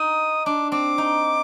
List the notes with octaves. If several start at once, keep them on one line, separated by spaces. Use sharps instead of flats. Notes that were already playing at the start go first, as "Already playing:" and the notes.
Already playing: D#4 D#6
D4 D6
C4 D6
D#4